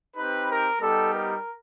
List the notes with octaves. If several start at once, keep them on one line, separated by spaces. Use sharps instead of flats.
C4 D#4 G4 B4
A#4
G3 B3 D#4 G4 A4
A#4